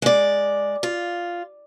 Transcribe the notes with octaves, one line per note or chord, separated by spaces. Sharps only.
G#3 D5
F4